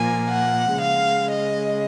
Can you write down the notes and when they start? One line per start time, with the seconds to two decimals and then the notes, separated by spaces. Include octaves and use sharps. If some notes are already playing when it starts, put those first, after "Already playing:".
Already playing: A#2 F3 A#3 G#5
0.29 F#5
0.79 C#3 G#3 F5
1.30 D#5